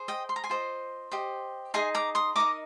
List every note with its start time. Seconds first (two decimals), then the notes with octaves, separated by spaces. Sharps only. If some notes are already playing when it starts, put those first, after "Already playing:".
Already playing: G#4 C5
0.08 D#5 G5
0.29 C6
0.36 A#5
0.44 G#5 C6
0.50 F4 C5 D#5
1.11 G4 C5 D#5
1.74 D#4 G#4 D#5 G#5 C6
1.95 A#5 D6
2.15 C6 D#6
2.36 D#4 A#4 D#5 A#5 D6